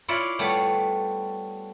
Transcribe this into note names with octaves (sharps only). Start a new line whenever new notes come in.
E4 F4 C#5 D5 E5 F5
G3 A3 B3 G4 C#5 F5